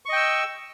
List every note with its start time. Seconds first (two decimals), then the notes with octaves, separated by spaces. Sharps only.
0.06 C#6
0.09 D#5
0.13 G5
0.16 E6